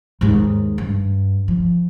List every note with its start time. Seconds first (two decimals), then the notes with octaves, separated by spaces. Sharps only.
0.21 D#2 G#2
0.78 G2
1.48 F3